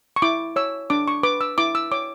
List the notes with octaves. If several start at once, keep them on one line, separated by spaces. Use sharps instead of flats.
C#6
E4 D6
C#5 E6
D4 D6
C#6
B4 D6
E6
E4 D6
E6
C#5 D6